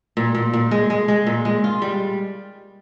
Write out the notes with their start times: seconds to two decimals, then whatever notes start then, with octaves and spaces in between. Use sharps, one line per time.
0.17 A#2
0.35 A#2
0.53 A#2
0.71 G#3
0.90 G#3
1.08 G#3
1.27 A#2
1.45 G#3
1.64 F4
1.82 G3